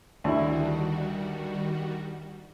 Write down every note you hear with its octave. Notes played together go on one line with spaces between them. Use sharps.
D2 D#3 G3 E4 F#4